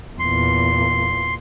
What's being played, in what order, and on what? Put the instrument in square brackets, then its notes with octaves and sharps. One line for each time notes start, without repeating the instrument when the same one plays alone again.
[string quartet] E2 A#2 [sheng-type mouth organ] C6